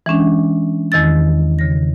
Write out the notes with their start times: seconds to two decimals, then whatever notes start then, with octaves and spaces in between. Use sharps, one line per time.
0.06 E3 G#3 C#4 D4
0.92 E2 D#3 E6 A6
1.59 C#3 A#6